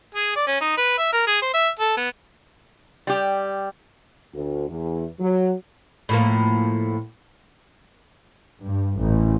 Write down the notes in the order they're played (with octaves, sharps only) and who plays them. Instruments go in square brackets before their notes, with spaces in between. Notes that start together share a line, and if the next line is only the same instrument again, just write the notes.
[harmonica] G#4
D5
C#4
D#4
B4
E5
A#4
G#4
C5
E5
A4
B3
[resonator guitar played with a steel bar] G3 G4
[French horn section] D2
E2
F#3
[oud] A2 F3 A#3
[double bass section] G2
A1